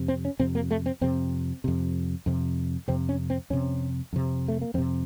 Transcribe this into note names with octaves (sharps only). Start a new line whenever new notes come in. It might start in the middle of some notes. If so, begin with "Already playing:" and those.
Already playing: F2 C3
C4
C#4
F2 C3 C4
A#3
A3
C4
F2 C3 C4
F2 C3
F2 C3
F2 C3 C4
C#4
C4
F2 C3 C#4
F2 C3
A3
A#3
F2 C3 C4